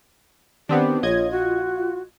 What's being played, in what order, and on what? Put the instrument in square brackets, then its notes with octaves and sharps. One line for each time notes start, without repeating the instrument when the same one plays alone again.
[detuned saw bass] D#3 [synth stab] B3 C4 D4 [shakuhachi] G4
[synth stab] A#1 D#5 G#6 [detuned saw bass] F4 [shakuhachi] C#5
[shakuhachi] F#4